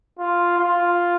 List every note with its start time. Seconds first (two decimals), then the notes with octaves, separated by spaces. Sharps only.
0.19 F4
0.58 F4